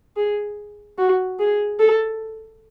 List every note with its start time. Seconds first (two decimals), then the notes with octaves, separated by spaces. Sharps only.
0.17 G#4
0.98 F#4
1.39 G#4
1.80 A4